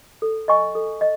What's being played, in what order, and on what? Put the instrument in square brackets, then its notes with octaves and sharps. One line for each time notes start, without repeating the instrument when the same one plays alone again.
[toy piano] A4
D#5 G#5 C#6
A4
D#5